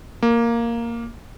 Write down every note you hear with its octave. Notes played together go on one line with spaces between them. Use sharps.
A#3